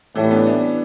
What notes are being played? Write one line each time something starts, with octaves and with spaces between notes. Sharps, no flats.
A2 E3 G3
B3 D4
B3 D4